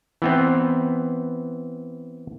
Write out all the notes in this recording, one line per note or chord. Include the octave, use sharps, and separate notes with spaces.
E3 B3 C4